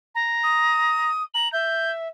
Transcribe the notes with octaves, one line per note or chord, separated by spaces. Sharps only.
A#5
D#6
A#5 F#7
E5 G6